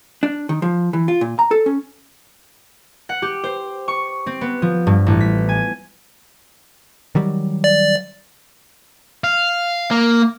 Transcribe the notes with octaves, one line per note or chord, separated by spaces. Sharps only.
D4
D#3
F3
E3
F4
A#2
A#5
A4
C#4
F#5
G4
C5
C#6
C4
B3
F3
G2
A1
B6
G#5
D#3 F#3 G3
D5
F5
A#3